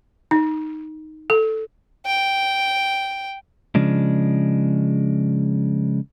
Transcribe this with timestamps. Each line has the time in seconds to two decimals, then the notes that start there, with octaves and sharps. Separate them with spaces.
0.31 D#4
1.30 A4
2.06 G5
3.75 C#3 F3 G#3 D4